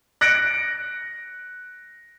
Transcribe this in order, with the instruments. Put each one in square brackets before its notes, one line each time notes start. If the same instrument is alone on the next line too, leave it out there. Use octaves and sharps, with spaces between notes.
[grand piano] F#6 A#6 C#7 D7